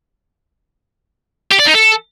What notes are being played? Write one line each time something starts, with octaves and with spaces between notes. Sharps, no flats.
G4
D5
D#4
A4